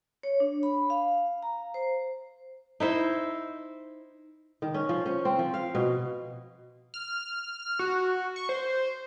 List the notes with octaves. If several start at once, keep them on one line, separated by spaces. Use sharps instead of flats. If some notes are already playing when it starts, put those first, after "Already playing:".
C#5
D4
B5
F5
A#5
C5
D#4 E4 C5
D#3
C#4
F3
C#4
C4
F3
F5
B2
F6
F#4
C#6
C5